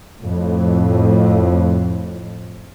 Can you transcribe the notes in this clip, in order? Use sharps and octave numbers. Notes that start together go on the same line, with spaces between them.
F2 A2